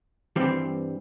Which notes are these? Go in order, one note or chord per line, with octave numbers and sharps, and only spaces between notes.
G2 E3 G3 C4